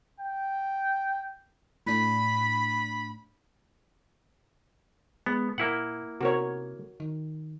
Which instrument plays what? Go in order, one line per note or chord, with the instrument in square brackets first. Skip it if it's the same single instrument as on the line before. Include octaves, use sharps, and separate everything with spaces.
[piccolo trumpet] G5
[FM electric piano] A2 D4 [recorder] B5
[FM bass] G#3 [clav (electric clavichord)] B3
[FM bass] A#2 [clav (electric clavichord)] A#3 E4 F#5
[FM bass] C3 [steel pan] F#4 A#4 C#5
[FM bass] D#3